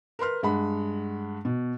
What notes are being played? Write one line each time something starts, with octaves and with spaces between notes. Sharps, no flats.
A#4 B4 C6 F6
G2 G#3 F#5 B5
B2